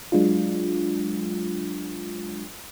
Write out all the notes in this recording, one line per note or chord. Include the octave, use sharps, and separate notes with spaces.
F#3 G#3 D4 F4